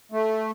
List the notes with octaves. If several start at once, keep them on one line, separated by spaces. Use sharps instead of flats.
A3